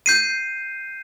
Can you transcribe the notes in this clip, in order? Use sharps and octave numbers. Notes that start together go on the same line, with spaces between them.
G6 C7 D#7